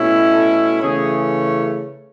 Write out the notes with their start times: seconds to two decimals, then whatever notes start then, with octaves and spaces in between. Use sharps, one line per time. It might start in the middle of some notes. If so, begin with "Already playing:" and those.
Already playing: B2 A3 C#4 E4
0.31 A4
0.81 C#3 E3 A3 C#4 G#4